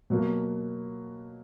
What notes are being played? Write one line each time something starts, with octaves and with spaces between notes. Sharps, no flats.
B2 F#3 A#3